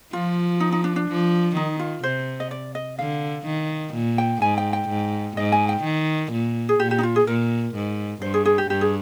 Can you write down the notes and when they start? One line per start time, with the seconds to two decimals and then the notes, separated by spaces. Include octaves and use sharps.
0.13 F3 F4
0.60 D#4
0.72 D#4
0.84 D4
0.96 D4
1.09 F3
1.56 D#3 D#4
1.79 F4
2.03 C3 C5
2.40 D#5
2.51 D5
2.75 D#5
2.99 D3 F5
3.46 D#3
3.94 A#2
4.18 G5
4.42 G#2 G#5
4.58 G5
4.73 G5
4.89 G#2
5.37 G#2 D#5
5.52 G#5
5.69 G5
5.84 D#3
6.32 A#2
6.69 G#4
6.80 A#2 G4
6.91 G4
6.98 D#4
7.03 F4
7.16 G#4
7.27 A#2 A#4
7.75 G#2
8.22 G2 C5
8.34 G#4
8.45 G#4
8.58 G4
8.69 G2 G4
8.81 G#4